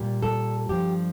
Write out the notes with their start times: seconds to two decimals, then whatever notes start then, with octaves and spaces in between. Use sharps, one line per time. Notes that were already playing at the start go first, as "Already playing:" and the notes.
Already playing: A#2 G3
0.23 A4
0.69 G2 F3 G4